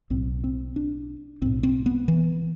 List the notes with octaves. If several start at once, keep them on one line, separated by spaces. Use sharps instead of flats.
B1 A2 C4
C4
D4
B1 A2 C4
C4
B3
E3